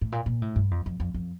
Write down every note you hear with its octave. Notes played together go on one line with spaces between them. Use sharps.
A2
A#2
A#2
A2
G2
F2
F2
F2
F2